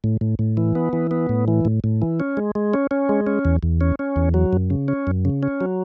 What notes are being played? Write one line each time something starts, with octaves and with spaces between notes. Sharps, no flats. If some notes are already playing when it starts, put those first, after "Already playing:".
A2
A2
A2
E3
B3
E3
B3
A2
E3
A2
A2
E3
C#4
G#3
G#3
C#4
C#4
G#3
C#4
E2
E2
C#4
C#4
E2
F#3
F#2
C#3
C#4
F#2
C#3
C#4
F#3